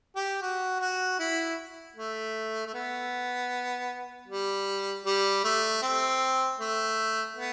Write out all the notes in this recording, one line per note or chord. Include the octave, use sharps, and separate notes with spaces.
G4
F#4
F#4
E4
A3
A3
B3
G3
G3
A3
C4
A3
B3